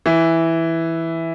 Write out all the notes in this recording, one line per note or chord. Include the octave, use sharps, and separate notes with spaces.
E3